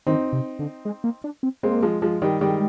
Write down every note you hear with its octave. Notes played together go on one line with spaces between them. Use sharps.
D#3 C4 D#4
C3
D3
G#3
A#3
D4
C4
G#3 A#3 C4
F3 G#3
F3 G#3
D#3 G3
D#3 G3 G#3